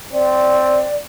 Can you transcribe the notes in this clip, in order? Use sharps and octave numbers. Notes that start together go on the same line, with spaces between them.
C4 D5